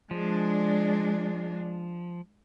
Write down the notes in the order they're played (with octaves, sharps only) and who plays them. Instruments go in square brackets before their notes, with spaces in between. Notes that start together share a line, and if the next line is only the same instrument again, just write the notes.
[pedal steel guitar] F3 [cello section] G#3 D4